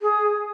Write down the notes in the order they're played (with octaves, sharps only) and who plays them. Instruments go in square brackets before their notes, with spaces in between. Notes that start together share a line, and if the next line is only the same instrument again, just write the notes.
[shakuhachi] G#4